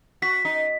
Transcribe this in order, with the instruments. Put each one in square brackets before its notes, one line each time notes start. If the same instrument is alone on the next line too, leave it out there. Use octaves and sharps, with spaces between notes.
[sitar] F#4 [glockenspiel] B6
[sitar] D#4